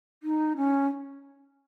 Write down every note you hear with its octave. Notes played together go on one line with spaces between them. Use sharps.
D#4
C#4